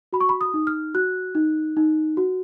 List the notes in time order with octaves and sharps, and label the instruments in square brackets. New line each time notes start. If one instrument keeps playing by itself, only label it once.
[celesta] F#4 B5
C#6
B5
D#6
D#4
F6
F#4 F#6
D#4
D#4
F#4